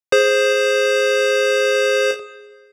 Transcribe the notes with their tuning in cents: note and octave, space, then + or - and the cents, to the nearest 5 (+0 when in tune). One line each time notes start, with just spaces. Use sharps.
G#4 +0 C5 +10